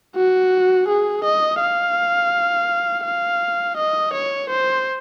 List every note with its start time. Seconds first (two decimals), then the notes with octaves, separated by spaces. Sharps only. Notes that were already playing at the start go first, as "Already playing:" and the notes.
0.16 F#4
0.88 G#4
1.24 D#5
1.60 F5
3.05 F5
3.77 D#5
4.13 C#5
4.50 C5